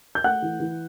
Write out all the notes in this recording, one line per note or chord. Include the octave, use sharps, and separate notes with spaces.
G6
A3 F#5 F#6
E3
E3